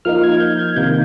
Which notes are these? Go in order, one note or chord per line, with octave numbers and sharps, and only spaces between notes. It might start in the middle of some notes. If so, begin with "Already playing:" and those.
F3 A#3 D#4 F6
G#6
G6
G#6
C3 D#3 A#3 G6